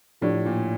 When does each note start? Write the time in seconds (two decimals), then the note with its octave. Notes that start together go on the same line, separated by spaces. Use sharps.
0.21 A2 F3 A3 D4 G4 D5
0.45 A#2